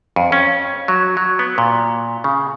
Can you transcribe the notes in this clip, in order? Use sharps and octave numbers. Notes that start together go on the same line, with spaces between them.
F2
C#4
F#3
F#3
B3
A#2
C#3